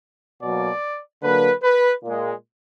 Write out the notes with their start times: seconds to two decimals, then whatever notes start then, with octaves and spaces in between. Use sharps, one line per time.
0.42 B2 F#3 A#3 D5
1.23 D3 F#3 A#3 B4
1.63 B4
2.04 A#2 G#3